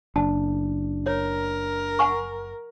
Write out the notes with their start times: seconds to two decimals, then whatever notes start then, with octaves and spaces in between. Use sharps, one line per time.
0.16 F#1 D4 A5
1.06 A#4 C#5
1.99 F#5 G#5 C#6